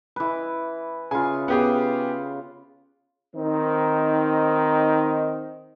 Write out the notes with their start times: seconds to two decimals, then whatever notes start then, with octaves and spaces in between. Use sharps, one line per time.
0.16 E3 B4
1.11 C#3 F4 G#5
1.48 B3 G4 G#4
3.35 D#3 C4 D#4